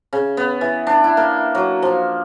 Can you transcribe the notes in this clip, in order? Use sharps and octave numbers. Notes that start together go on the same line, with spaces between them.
C#3
B3
E3
D4
E4
A#3
F#3
F3